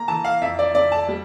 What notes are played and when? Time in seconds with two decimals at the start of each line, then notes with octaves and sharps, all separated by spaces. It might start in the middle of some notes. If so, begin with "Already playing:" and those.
Already playing: A#3 A#5
0.08 E3 A5
0.24 F5
0.42 F2 E5
0.59 D5
0.75 F2 D5
0.92 A5
1.08 G3